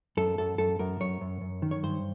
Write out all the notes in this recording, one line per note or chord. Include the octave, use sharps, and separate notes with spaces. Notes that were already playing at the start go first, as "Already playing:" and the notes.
F#2 A4
F#2 A4
F#2 A4
F#2 A#4
F#2 C#5
F#2
F#2
D#3
C#5
G2 C5